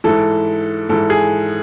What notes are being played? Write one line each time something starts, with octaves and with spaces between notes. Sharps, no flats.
G#2 E3 A4
G#2 E3 A4
G#4